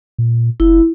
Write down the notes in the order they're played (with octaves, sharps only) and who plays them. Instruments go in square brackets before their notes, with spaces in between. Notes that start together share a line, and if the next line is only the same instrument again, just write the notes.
[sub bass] A#2
[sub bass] F#1 [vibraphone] E4